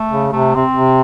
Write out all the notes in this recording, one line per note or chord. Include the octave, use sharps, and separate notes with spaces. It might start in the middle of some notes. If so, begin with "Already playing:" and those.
Already playing: A3
C#3
C3 A3
C3 C4
C3